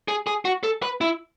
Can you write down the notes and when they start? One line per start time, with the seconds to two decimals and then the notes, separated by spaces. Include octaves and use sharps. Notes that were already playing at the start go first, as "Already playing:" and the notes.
0.08 G#4
0.27 G#4
0.45 F#4
0.63 A4
0.82 B4
1.01 E4